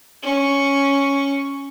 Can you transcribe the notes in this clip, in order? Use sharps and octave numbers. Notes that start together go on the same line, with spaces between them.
C#4 C#6